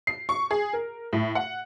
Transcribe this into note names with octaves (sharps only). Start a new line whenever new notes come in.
C7
C#6
G#4
A#4
A2
F#5